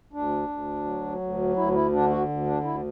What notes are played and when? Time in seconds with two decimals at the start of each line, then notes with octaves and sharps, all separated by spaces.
0.13 D2 D4
0.49 D2
0.85 F#3
1.21 D2
1.56 D2 E4
1.74 E4
1.92 D3 D4
2.10 F#4
2.28 D2
2.46 D4
2.64 D2 E4